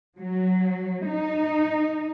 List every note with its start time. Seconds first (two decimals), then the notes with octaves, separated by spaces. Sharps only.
0.17 F#3
1.05 D#4